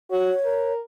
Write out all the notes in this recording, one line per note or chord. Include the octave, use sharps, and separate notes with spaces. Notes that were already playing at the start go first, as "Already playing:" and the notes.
F#4 C#5
A#4